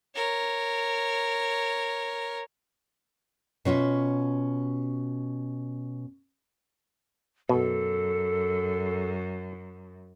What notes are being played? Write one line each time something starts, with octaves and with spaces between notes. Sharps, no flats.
A#4 C#5
B2 C#4 F4 E5
F#2 B2 A4